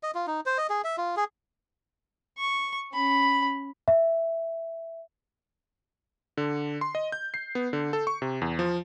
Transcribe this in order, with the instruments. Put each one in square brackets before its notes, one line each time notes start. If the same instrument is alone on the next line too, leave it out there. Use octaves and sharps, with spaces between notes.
[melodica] D#5
F4
D#4
C5
D#5
G#4
E5
F4
G#4
[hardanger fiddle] C#6
C#4 B5
[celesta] E5
[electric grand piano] D3
C6
D#5
G6
C7
B3
D3
A4
C#6
C3
E2
F3